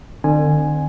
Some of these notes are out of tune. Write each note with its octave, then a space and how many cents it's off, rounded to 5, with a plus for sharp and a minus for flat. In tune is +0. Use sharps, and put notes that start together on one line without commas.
D3 +40 C4 +0 G#5 +0